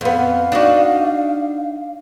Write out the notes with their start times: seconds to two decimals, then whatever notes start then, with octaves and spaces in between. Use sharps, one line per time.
0.01 F2 B3 F5
0.52 D4 D#4 F#4